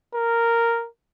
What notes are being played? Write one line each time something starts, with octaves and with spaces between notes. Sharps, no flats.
A#4